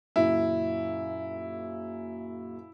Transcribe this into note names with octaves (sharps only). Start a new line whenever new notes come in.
F#2 A#2 C#3 E4